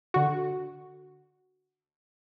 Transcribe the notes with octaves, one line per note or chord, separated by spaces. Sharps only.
D3 F#4